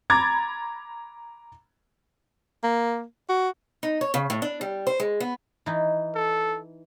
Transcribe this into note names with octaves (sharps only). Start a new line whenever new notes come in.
A#5 B5 D6 G#6 A6
A#3
F#4
D#4
C#5
C#3
A2
D4
G3
C5
G#3
B3
E3 D#4
A4